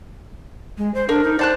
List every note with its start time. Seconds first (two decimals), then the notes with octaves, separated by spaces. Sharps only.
0.78 G#3
0.94 C5
1.09 D4 A#4
1.24 D#4
1.39 C5 D5 A5 F#6